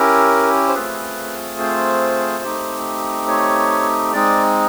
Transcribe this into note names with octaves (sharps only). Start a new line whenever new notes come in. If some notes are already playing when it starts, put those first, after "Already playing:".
Already playing: C#4 E4 G4 A#4
C5
A3 C4 F4 G#4 B4
C5
A3 C4 D#4 G4
C#5
G#3 C4 D#4 D5